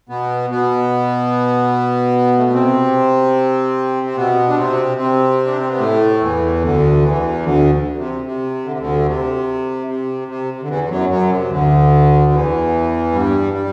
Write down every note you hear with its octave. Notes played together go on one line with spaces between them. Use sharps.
B2 B3
B2 B3
A3
B3
C3 C4
C4
B2 B3
D4
C3 C4
C3 C4
D4
C4
B3
A2 A3
E2 E3
D2 D3
E2 E3
D2 D3
C3
C3
D3
C3
D2 D3
C3
C3
C3
C3
D3
E2 E3
E3
F#2 F#3
F#2 F#3
C3
D2 D3
E2 E3
G2 G3
G3